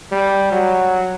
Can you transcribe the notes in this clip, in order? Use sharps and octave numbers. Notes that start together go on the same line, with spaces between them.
G3
F#3